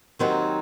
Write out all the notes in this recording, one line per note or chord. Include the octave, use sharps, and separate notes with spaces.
D#2 D#3 F#3 C4 D#4